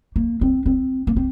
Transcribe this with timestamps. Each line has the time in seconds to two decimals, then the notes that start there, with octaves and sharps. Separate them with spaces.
0.16 A#3
0.41 C4
0.66 C4
1.07 A#3
1.16 C4